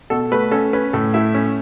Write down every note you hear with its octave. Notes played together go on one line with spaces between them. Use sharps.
B2 A4
A3 B4
C#4 A4
C#4 B4
A2 A4
A3 E4 E5
C#4